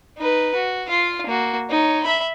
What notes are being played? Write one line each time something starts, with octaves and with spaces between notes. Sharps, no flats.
D#4 B4
F#4
F4 F5
A#3 F#4
D#4 C#5
E5 B5